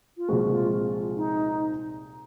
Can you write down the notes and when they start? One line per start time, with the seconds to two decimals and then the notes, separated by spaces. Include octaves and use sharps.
0.17 F4
0.28 C2 A#2 F3 G#3 F#4
0.50 F4
1.16 D#4